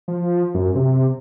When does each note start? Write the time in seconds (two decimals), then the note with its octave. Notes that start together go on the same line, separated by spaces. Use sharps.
0.08 F3
0.54 F#2
0.75 C3